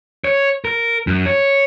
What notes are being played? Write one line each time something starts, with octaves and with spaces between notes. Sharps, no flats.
C#5
A#4
F#2
C#5